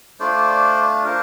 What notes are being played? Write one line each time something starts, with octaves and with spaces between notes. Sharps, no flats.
A3 D4 F4 C5 D5
D4 F4 A#4 C5